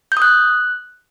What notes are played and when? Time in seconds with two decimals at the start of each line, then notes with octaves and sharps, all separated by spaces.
0.12 G6
0.17 D#6
0.22 F#6